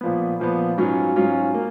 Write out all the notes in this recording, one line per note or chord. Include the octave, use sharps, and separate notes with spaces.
A#2 F3 B3
A#2 F3 B3
G#2 F#3 C#4 F4
G#2 F#3 C#4 F4
A#3